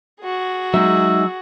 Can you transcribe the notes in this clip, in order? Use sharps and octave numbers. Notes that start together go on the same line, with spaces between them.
F#4 G#4
F#3 G#3 D#4 E5 E6